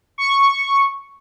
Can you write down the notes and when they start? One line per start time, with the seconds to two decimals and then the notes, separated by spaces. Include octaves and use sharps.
0.18 C#6